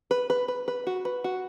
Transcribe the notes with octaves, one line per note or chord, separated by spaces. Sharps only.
B4
B4
B4
B4
F#4
B4
F#4